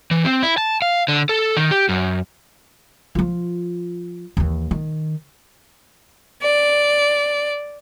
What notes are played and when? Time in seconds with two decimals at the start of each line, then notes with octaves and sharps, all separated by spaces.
0.11 E3
0.24 C4
0.43 E4
0.58 A5
0.82 F5
1.08 D3
1.29 A4
1.57 D#3
1.71 G4
1.89 F#2
3.15 F3 F4
4.37 D#2 E3
4.71 D#3
6.43 D5